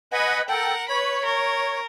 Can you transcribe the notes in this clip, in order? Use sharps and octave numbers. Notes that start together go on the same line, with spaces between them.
B4 D#5 F#5 G#5 B5
A4 A#4 F#5 G5
B4 C#5 B5
A#4